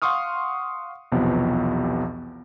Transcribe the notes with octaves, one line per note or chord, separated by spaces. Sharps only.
F5 F#5 C6 C#6 D#6 F6
B1 E2 C3 F3 B3